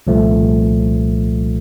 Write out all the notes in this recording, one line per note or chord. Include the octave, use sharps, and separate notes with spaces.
C2 A#2 F3 A3